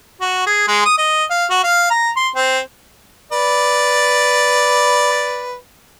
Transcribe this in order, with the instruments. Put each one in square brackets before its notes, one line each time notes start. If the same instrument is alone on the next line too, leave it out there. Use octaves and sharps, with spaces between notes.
[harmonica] F#4
G#4
G#3
D#6
D#5
F5
F#4
F5
A#5
C6
C4
B4 D5